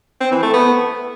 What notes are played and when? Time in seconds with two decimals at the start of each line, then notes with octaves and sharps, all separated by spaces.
0.21 C4
0.32 E3
0.43 A3
0.54 B3